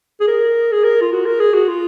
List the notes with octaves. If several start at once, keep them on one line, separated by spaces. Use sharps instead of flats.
G#4
A#4
G#4
A#4
F4
F#4
A#4
G#4
F#4
F4